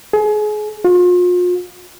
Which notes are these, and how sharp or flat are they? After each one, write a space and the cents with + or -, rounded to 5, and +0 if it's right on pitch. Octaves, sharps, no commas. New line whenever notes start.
G#4 +30
F4 +40